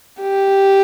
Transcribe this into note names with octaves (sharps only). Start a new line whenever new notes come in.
G4